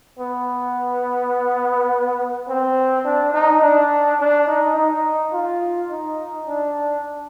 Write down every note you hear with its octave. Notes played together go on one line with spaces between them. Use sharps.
B3
C4
D4
D#4
D4
D4
D#4
D#4
F4
D#4
D4